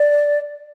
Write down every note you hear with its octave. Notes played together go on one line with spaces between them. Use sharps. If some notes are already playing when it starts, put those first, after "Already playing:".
Already playing: D5